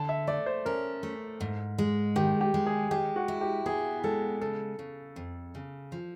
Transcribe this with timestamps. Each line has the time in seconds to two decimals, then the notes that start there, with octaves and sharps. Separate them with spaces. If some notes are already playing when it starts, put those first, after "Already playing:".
Already playing: D3 A5
0.09 E5
0.27 A3 D5
0.46 C5
0.66 C#4 A#4
1.03 A3
1.41 G#2
1.78 G#3
2.16 D#3 G4
2.41 G4
2.54 G#3
2.66 G#4
2.91 G#3 G4
3.16 F#4
3.28 E4
3.41 G4
3.66 B3 G#4
4.04 G#3 A4
4.41 C#3 A4
4.79 C#3
5.16 F2
5.55 C#3
5.92 F3